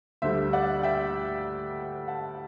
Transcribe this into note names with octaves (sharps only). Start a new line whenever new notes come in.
D2 D3 G3 C5 E5
D5 F#5
E5 G5
F#5 A5